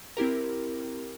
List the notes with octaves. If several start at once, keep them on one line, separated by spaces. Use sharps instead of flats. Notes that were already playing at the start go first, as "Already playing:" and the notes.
C4 E4 G4 A#4